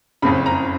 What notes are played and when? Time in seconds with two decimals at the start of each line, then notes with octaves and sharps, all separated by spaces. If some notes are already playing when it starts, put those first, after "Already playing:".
0.22 F#1 F2 C#3 B5
0.46 A#5